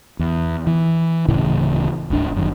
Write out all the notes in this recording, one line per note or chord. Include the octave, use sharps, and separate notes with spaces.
E2
E3
D1 A2 C#3 E3
D1 G#1 D4
G1 F#2 D#3